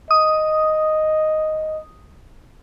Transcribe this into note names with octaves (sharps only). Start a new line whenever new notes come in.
D#5 D#6